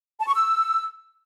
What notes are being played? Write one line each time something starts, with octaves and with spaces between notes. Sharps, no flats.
A5
C#6
E6